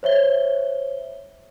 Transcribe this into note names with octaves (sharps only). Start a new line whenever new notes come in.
C5 C#5 E5 G7